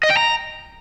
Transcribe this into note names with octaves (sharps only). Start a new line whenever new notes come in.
D#5
G5
A#5